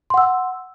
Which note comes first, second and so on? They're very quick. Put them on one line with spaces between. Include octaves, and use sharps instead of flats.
C6 F#5 E6